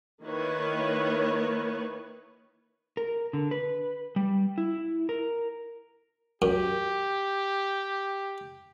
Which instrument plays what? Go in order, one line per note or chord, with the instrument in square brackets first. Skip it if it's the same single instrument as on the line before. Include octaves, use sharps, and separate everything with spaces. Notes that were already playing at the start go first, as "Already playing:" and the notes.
[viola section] D#3 A#3 E4 B4 C#5
[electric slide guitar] A#4
D3
B4
G3
E4
A#4
[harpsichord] F#2 [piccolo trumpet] G4